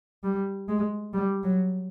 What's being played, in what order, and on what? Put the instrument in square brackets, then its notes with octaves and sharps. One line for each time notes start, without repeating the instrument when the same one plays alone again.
[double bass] G3
G#3
G3
F#3